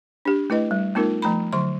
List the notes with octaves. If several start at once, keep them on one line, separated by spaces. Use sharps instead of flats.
D4 G4
A3 E4 B4 D#5
G3
A3 B3 D#4 F4 A#4
F3 A3 A#5 B5
D3 F#3 C6